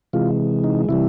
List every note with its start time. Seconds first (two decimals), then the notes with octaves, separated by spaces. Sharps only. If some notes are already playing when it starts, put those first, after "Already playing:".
0.13 C3 E3 G#3 F4
0.64 D#4
0.89 C3 E3 G3 E4